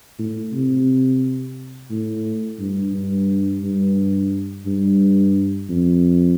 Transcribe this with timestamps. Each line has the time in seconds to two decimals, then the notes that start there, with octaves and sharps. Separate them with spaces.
0.19 A2
0.53 C3
1.90 A2
2.59 G2
2.94 G2
3.62 G2
4.66 G2
5.69 F2